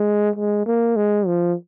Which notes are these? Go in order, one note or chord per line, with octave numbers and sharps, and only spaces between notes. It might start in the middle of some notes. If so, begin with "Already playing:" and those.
Already playing: G#3
G#3
A#3
G#3
F3